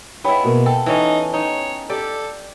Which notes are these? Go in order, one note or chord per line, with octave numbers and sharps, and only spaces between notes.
G#3 B3 E4 C#5 G5 B5
B2 A#3
A4 G5
E3 C#4 D#4 A4
D#4 C#5
G4 A4 D5